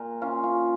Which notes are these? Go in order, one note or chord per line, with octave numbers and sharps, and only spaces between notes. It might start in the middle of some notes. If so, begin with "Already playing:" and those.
Already playing: A#2
C#4 F4
F4